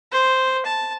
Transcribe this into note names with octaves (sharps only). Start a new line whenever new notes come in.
C5
A5